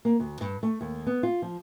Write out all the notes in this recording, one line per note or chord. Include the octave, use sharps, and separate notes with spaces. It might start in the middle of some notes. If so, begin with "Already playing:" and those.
A#3
D2
G2
A3
D#2
B3
F4
F3